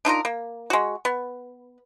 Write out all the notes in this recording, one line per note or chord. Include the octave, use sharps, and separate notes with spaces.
D4 D#4 F4 A#4
A#3
G#3 F#4
B3